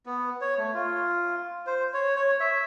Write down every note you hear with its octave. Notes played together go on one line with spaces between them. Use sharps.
B3
C#5
A3
F4
C5
C#5
C#5
E5